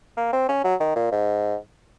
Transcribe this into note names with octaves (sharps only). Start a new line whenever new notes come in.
A#3
C4
C#4
F#3
D#3
A#2
G#2